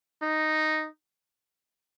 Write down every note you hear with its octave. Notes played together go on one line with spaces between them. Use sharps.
D#4